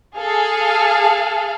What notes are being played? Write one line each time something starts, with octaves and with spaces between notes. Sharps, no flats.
G#4 A4 F5